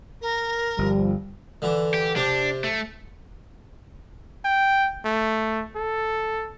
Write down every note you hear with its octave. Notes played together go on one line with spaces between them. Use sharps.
A#4
G1 F3 G3
D3 E3
G4
C3 D4 G4
A3
G5
A3
A4